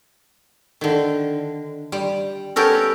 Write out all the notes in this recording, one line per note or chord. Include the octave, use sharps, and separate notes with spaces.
D3 D#3
G3
B3 C#4 G4 A4 A#4